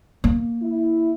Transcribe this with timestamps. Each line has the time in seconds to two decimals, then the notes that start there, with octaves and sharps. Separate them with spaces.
0.24 A#3
0.62 E4